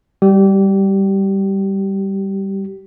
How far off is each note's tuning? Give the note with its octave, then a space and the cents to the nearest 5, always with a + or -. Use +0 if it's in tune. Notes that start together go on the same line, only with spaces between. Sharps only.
G3 +0 G4 -25